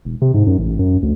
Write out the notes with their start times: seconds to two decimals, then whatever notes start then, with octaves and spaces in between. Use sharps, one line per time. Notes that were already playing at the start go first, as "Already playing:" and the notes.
0.05 E1
0.22 C3
0.34 G#2
0.46 F#2
0.58 A1
0.79 F#2
1.02 D2